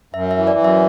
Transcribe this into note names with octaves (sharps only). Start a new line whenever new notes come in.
F#2 E5
E5
E3
D5
F#2
E5